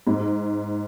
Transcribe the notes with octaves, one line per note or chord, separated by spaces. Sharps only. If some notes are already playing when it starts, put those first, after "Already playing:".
G#2